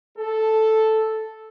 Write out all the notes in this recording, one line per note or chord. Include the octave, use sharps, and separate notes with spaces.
A4